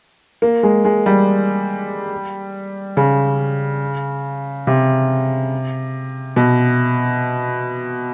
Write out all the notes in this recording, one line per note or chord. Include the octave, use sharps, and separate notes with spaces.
A#3
G#3
G#3
G3
C#3
C3
B2